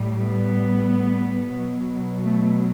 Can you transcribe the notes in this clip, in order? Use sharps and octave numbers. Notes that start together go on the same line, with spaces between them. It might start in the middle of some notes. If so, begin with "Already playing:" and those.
Already playing: A2 G3
B3
B2 F#3
A3